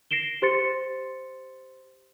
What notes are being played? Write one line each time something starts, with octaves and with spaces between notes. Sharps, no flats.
A#6 C7 D7 E7 G7
G4 C5 C6 A6 C#7